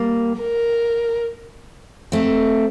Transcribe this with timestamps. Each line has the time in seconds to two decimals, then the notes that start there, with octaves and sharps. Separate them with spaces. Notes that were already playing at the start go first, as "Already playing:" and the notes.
Already playing: G3 A#3
0.41 A#4
2.12 A3 C4